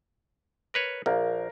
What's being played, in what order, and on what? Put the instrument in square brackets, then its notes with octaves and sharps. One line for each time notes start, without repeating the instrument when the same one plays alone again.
[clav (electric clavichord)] A#4 B4 C#5
[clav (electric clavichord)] A#1 [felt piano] A#4 F5